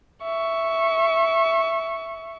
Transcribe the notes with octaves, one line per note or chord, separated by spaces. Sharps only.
E5 C#6